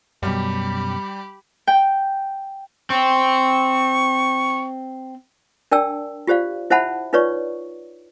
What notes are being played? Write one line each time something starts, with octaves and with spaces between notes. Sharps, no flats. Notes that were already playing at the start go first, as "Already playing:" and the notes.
F#2 B2 G3 G4 B5
G5
C4 C#6
D4 A#4 D5 G5 A5 E6
F4 G4 C5 D5 F5
E4 C5 E5 F#5 A5 B5
D#4 F4 B4 C#5 D5 C#6